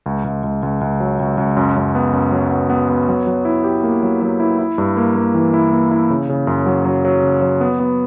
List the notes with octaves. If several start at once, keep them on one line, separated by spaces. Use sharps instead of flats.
C#2
C#2
C#2
C#2
C#2
F#3
C#2
C#2
F#2
F#2
B3
F#2
F#3
B3
B3
B3
F#3
F#3
E4
G4
A#3
F#3
F#3
E4
E4
G2
A#3
A#3
E3
E4
A#3
E4
C#3
C#3
F#2
F#3
F#3
F#3
C#3
F#3
B3
B3